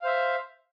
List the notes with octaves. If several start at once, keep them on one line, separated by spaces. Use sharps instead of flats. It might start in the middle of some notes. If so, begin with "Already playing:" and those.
C5 E5 F5